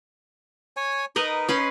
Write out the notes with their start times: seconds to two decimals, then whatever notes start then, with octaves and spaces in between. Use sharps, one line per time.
0.77 C#5 G#5
1.16 D#4 A#4 B4 D#5
1.49 C#4 B4 C6